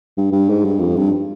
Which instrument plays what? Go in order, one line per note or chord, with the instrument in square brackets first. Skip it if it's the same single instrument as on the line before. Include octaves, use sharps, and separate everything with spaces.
[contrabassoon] G2
G2
G#2
G2
F2
G2